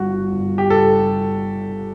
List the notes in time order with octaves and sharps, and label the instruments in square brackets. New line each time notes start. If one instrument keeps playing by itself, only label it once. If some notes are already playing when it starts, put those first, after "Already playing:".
Already playing: [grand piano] G1 G2 [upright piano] F#4
[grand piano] G1
[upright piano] G4
[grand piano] G1 [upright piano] A4